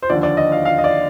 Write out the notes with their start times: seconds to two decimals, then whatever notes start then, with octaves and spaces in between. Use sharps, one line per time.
0.02 C5
0.10 D#2 D3 F3 D5
0.23 D5
0.37 D#5
0.52 F5
0.65 F5
0.78 D#5
0.84 D5